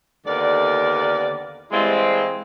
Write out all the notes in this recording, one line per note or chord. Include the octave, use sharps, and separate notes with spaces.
D#2 D3 B3 A#4 D5
E3 G3 G#3 A#3 C4 E4